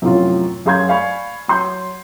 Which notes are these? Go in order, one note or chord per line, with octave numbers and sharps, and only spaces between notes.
F#2 A2 C3 F3 F4
F#2 G#4 F5 C6 G6 G#6
D5 F5 G#5 B5 C#6
F#3 C6 G6